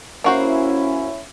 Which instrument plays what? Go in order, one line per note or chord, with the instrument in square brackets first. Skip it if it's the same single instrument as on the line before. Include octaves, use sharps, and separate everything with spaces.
[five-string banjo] A#3 F#4 C5 [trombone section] C#4 E4